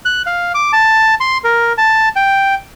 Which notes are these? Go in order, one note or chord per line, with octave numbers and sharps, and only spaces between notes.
F#6
F5
D6
A5
C6
A#4
A5
G5